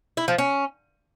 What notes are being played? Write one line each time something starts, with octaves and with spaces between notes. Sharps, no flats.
E4
F3
C#4